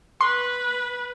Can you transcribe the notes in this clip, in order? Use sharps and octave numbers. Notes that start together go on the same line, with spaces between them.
B4 C6